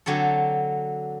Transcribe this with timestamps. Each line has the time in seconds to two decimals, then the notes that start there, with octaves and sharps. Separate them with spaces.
0.06 D3 F#3 C4 A4